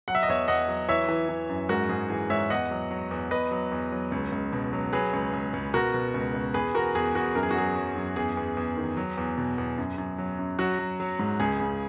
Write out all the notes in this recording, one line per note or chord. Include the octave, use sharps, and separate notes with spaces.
F#3 F#5
E5
D#5
E2 C#5 E5
E2 D#5 F#5
F#3
E3 C#5 E5
E3
E3
F#2
G#2 F#4 A#4
G#2 G#4
E3 G#4
G#2 C#5 E5
E2 D#5 F#5
F#3
F#3
E2
E2 B4 D#5
F#3
E2
F#3
C#2
C#2
B2
F#3
F#3 G#4 B4
C#2
C#2
C#2
B2 F#4 A#4
B2
C#2
C#2
E2 G#4 B4
E2 F#4 A#4
E2 G#4
E2 F#4
F#2 A#4
G#4
F#4
F#3 G#4
F#3
F#2
E2 G#4
E2
E2
D#3
F#3
E2
B2
E2
F#2
F#2
F#3
F#2
F#3 F#4
F#3
F#3
G#2
C#2 G#4
C#3